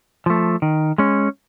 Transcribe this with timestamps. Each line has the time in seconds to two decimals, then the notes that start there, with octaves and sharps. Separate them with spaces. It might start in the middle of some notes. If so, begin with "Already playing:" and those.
0.26 F3 A3
0.62 D#3
0.98 G#3 C#4